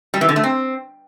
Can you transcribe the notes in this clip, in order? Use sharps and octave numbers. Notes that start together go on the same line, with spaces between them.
G3
E3
D3
A3
C4